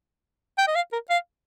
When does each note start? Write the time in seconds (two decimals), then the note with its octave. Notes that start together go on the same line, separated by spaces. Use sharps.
0.58 G5
0.68 D#5
0.75 F5
0.93 A#4
1.10 F5